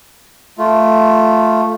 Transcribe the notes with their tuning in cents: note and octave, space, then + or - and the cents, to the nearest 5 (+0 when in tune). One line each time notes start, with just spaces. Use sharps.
A3 +0 F4 +0